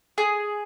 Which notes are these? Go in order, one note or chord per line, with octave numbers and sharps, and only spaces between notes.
G#4